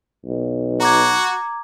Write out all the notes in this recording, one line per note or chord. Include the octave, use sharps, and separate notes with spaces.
B1
F#4 A#5 D6 G#6